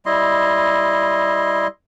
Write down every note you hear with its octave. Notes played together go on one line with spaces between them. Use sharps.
G3 E4 D#5 C6